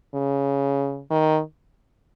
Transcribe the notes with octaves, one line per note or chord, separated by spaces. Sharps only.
C#3
D#3